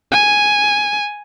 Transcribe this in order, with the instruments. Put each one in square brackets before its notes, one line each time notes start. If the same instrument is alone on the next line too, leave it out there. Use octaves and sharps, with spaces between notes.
[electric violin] G#5